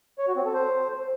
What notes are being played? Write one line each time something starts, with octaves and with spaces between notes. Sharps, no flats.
C#5
F#4
C4
A4
C5